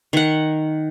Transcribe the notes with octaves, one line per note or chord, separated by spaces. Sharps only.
D#3 F#5